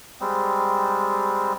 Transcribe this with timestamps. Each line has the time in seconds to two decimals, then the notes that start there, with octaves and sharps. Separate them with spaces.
0.20 G3 G#3 C4